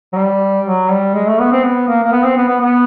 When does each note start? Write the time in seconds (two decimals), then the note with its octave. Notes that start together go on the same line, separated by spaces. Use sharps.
0.13 F#3
0.17 G3
0.66 F#3
0.91 G3
1.15 G#3
1.27 A3
1.40 B3
1.52 C4
1.64 B3
1.88 A#3
2.04 A#3
2.12 B3
2.25 C4
2.37 B3
2.49 B3
2.61 B3